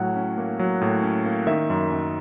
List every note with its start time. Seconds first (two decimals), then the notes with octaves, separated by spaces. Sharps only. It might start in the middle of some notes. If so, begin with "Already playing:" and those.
Already playing: A2 F#3 F#5
0.16 C#4
0.38 A#3
0.59 F#3
0.81 A2
1.03 C#4
1.25 A#3
1.47 D#3 E5
1.70 F#2
1.92 F#2